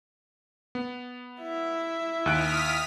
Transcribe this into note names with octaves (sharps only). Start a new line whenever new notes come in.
B3
E4 E5
D#2 D#6 F6 F#6 B6 D7